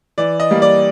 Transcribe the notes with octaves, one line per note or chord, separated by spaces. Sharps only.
E3 D5
D#5
G3 A#3
D5